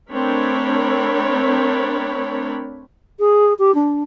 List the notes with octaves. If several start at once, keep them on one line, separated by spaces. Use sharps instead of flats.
A3 C4 D4 A#4 C#5 B5
G#4
G4
D4